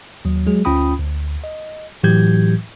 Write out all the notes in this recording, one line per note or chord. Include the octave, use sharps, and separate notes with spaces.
D#2 F#3
F#3 G#3 G#4
D2 C#4 F4 G5 B5 D#6
D2
D#5
A2 E3 F#3 G4 G6 G#6